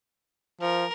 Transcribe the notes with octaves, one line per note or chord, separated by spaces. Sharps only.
F3 A#4